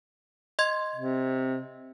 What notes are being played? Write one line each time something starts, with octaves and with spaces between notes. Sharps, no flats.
D#5 C6 G#6
C3